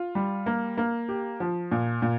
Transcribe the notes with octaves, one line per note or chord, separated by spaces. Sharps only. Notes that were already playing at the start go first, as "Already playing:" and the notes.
Already playing: F4
G3
A#3
A#3
G4
F3
A#2
A#2